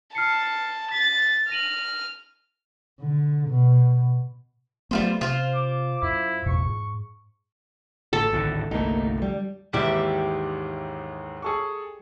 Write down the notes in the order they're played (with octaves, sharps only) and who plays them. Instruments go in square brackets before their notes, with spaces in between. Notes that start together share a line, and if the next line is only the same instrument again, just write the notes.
[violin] A5 [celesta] F6 C7 C#7
[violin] A6 [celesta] B6
[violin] F6 [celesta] A#6 D#7 F#7
[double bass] D3
B2
[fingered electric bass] F#3 A3 B3 [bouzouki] G3 F4 C5
[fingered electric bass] C3 [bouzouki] F4 C5 [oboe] F5
[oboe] D6
[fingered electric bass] F#2 [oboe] E4
[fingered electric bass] A1 E2 B2 [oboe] C#6
[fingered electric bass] G#2
[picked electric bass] A1 [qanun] A4
[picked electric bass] G#1 D2 A2
[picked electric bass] G1 C2 A3 [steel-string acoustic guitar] A#3 D#4
[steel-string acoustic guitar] D3 G3
[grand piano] D#2 G#2 E3 [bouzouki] G3 G4 E5
[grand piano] G#4 A4 C#6